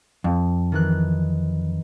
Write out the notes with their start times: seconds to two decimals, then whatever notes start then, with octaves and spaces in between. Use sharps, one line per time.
0.24 F2
0.72 D#3 E3 F#6